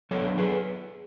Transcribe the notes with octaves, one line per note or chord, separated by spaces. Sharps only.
F#3 B3 D4 A4 C#5
G#4 B4